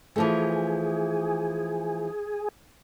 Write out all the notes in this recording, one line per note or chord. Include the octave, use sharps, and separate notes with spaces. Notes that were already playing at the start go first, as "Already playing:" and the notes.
E3 F3 A3 G#4